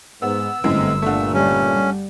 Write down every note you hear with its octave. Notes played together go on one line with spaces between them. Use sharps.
G#2 B3 E6
G1 F#2 E3 G#3 A3 C4 D#5
G2 A#2 D3 A3
G3 C#4